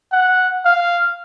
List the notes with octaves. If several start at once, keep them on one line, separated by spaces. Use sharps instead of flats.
F#5
F5